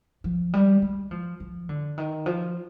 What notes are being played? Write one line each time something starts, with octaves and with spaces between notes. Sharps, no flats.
F3
G3
G#3
F3
F3
D3
D#3
F3